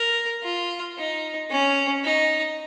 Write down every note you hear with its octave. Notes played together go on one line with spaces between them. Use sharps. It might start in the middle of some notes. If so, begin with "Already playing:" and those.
Already playing: A#4
F4
D#4
C#4
D#4